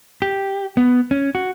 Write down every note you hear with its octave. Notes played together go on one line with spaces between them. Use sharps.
G4
B3
C#4
F#4